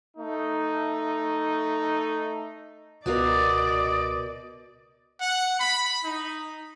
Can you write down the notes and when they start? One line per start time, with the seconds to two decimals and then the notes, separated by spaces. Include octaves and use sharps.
0.17 A3 D#4
3.06 C#2 B2 F#4 A#4 D5 D#5 F5
5.20 F#5
5.60 B5
6.04 D#4